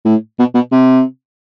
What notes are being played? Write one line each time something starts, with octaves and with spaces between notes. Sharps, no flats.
A2
B2
B2
C3